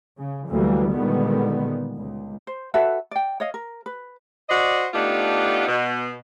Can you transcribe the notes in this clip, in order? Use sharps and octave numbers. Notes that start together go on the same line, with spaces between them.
C#3
D2 E3 F#3 G3 A3 A#3
A#2 D3 D#3 G3 G#3 B3
C#2
C5
F#4 A4 B4 E5
D5 G5
C#5 D#5 F5
A#4
B4
F#4 C5 D5 D#5
A3 B3 D4 D#4 F4 G4
B2